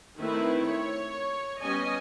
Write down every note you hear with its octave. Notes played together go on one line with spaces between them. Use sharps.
D#3 A3 C4 E4 B4 E5
C#5
G3 B3 C#4 D#5 G#5